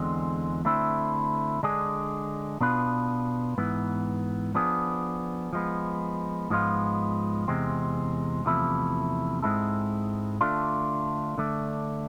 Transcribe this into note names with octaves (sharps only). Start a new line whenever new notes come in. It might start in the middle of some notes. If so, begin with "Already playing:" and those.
Already playing: E2 D3 G#3 C4
D3 A3 C4 E4
D3 G#3 D4 G#4
B2 B3 D4 F4 B4
G#2 E3 B3
F3 B3 D4 G#4
F3 G#3 B3
G#2 F3 G#3 B3 F4
E2 C3 G#3 C4
E2 C3 F3 A3 E4
G#2 G#3 C4 E4 A4
D3 A3 D4 F4
D3 A3 D4